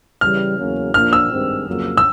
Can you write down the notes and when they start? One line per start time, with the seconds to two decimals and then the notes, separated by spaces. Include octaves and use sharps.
0.21 C#3 E3 G3 F6
0.57 E2 C#3 F#3 A#3 C#4
0.94 A#2 F3 A#3 D4 F6
1.13 E6
1.30 G2 D#3 G#3 C4
1.67 F2 C#3 F#3 A#3
1.97 E6